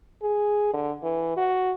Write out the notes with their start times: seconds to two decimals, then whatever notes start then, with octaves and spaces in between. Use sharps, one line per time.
0.22 G#4
0.73 D3
1.03 E3
1.37 F#4